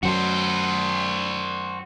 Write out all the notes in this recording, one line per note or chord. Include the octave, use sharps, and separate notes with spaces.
F#2 F#3 F#4 C5